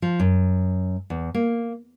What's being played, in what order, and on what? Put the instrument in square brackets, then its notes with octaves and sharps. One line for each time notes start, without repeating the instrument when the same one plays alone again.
[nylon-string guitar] F3
F#2
E2
A#3